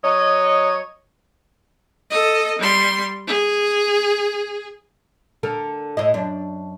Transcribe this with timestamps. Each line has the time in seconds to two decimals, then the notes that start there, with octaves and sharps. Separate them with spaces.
0.04 F#3 C#5 D#5
2.10 A4 D#5
2.59 G3 C6
3.27 G#4
5.43 D3 A4 A#4
5.97 A2 E4 D#5
6.14 F#2 D4